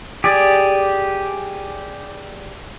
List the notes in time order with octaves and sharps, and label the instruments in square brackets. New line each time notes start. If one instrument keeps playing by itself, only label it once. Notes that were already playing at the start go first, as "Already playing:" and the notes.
[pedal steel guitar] G4 G#4 D5